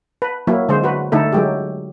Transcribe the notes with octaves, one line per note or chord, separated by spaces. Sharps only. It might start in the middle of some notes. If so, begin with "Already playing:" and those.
B4
F#3 A#3 E4
D3 G#3 C5
F#4 B4
D3 A3 D#4 E4 A4
F#3 G#3 G4